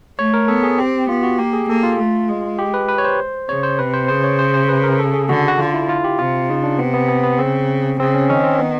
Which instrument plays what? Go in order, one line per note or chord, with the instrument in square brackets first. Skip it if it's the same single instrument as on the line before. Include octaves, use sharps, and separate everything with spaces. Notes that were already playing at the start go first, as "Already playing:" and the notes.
[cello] A3 [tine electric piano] C#5
[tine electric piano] A#4
[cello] B3 [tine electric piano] A4
[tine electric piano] G#4
[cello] C4 [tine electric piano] G4
[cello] B3 [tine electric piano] F4
[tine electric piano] F#4
[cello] A#3 [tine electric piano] G4
[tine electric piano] G#4
[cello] A#3 [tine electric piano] A4
[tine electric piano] F4
[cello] A3
G#3
[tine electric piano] G4
B4
B4
C#5
C5
[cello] C#3 [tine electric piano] C#5
[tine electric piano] C5
[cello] C3 [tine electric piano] B4
[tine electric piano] C5
[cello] C#3 [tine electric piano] C5
[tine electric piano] C#5
C5
C5
B4
A#4
A4
G#4
[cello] D3 [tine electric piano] F#4
[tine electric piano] F#4
[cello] D3 [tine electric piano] F4
[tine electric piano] E4
F4
G4
[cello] C3 [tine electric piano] F4
[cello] C#3 [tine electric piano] D#4
[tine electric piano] D4
[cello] C3 [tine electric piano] B3
[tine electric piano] B3
B3
B3
[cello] C#3 [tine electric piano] C4
[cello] C#3 [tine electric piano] C4
[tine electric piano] C#4
[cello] D#3 [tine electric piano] C#4
[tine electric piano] C4
B3